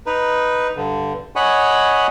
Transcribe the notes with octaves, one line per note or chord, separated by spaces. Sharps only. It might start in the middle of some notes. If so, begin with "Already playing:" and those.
D#4 B4
G2 D3
C#5 D#5 F#5 G#5 B5 C#6